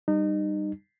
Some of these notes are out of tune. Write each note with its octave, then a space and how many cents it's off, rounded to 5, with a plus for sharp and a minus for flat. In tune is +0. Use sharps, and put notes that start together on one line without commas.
G3 +0 D#4 -30